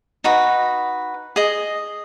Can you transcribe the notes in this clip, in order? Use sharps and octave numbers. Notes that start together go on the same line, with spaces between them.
D#4 F#4 B4
G#4 D#5